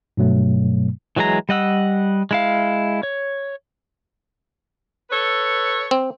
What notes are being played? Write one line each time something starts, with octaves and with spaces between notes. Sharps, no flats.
G2 B2 F#3 A3
E3 F#3 G#3 G#4 A#5
G3 D#5 F#5 E6
G#3 E4 F5
C#5
A4 B4 C#5
C4